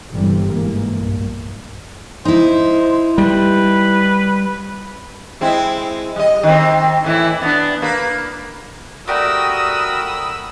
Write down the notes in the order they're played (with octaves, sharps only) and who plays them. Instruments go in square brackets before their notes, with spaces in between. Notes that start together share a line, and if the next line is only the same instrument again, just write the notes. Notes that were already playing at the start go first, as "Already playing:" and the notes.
[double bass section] G1 G2 C3 E3 G3
G#2 E3 A#3
B1 G2 A#2
[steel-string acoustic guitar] D#4 E4 [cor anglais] C5
[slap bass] G3 [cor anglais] B4
[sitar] G#3 C4 E4
G3 D#5
D#3 C4
A2 E3 E4
B3 D4
A#3 B4
[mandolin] A3 G4 D5 [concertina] F#4 A#4 [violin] B5 E6 [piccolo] D#6